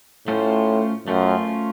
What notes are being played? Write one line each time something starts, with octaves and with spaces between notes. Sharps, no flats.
A2 A3 C#4 F4 C5
F#2 A3 C#4 F4 C5